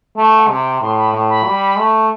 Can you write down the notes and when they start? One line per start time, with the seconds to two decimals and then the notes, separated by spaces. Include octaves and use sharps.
0.16 A3 A5
0.27 A5
0.37 F#5
0.48 C3 G5
0.81 A2 C6
0.97 B5
1.13 A2
1.30 B5
1.45 G3
1.78 A3